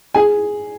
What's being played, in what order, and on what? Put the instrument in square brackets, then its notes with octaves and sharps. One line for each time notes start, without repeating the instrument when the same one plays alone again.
[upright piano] G#4 G#5